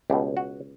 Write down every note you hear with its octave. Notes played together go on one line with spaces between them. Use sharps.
C#2 B2 G4
F#4